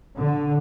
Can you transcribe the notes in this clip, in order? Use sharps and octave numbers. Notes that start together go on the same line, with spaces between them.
D3